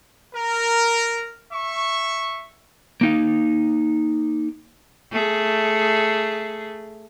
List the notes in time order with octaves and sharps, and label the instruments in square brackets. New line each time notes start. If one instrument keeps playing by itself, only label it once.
[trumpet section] A#4
E5 C#6
[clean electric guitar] A#3 D#4 F5
[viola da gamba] A3 G#4